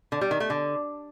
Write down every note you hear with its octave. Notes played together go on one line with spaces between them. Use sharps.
D3
G3
D#3
A3
D3